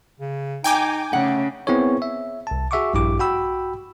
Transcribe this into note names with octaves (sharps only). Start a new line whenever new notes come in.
C#3
D#4 G5 G#5 D6
C#3 A3 F#5
B3 C4 E4 G#4 C#5
E5
C2 A5
F#4 G#4 E5 F#5 C#6 D6
A#1 G2 E4 G4 D6
F#4 G5 B5 E6